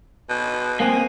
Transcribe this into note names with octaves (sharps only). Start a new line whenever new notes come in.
B2
A#3 C4 G#4